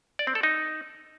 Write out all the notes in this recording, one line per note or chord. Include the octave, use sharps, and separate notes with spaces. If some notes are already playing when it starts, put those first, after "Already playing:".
D5
C4
A4
D#4